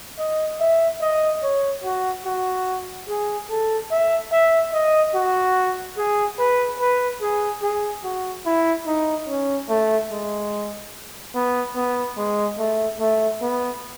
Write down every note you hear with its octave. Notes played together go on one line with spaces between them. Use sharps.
D#5
E5
D#5
C#5
F#4
F#4
G#4
A4
E5
E5
D#5
F#4
G#4
B4
B4
G#4
G#4
F#4
E4
D#4
C#4
A3
G#3
B3
B3
G#3
A3
A3
B3